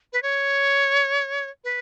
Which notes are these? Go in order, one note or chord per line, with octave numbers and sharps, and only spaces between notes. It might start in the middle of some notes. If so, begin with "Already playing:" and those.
B4
C#5
B4